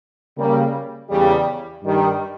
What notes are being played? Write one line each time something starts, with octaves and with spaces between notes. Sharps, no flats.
C#3 G3 A#3
E2 C#3 G3
G2 D#3 G3